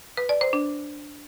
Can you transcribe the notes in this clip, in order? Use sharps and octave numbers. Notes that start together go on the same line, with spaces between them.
B4
D5
C5
D4